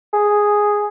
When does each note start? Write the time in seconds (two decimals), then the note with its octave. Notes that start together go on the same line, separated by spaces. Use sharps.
0.13 G#4